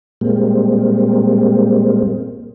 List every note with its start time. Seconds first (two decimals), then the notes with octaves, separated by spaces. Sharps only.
0.21 A#2 G3 G#3 A#3 C4